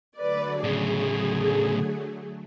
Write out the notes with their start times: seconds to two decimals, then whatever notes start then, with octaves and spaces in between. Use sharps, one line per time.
0.18 D3 F#3 A3 B4 D5
0.64 A2 C#3 G#4